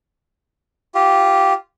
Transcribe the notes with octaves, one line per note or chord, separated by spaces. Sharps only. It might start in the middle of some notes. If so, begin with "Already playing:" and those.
F4 G4